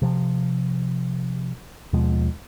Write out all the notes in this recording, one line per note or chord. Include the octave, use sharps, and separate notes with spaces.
C3 F3
D#2 B2 F3 G#3